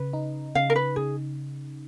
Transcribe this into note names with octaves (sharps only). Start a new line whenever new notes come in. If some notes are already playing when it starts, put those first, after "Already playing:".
Already playing: C#3 B4
D#4
C#3 F5
A#4
B4
C#3 G#4